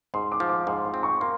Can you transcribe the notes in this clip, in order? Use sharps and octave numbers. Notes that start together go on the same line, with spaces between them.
G#2 C6
D6
F3
D6
G#2 C6
C6
C4
C#6
A#3 C6